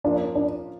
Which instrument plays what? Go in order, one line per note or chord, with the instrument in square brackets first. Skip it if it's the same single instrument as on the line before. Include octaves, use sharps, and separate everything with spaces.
[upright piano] F3 A#3 C#4 F4 [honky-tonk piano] D4
[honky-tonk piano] D4